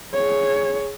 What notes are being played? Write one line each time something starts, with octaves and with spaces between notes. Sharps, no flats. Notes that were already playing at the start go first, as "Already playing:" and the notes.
G#4 C#5